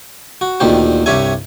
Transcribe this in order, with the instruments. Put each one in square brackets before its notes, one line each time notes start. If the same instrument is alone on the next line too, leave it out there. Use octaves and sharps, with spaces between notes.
[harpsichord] F#4
D2 A#2 D#3 C4 G4 C5
C2 G2 G4 C#5 E5 G#5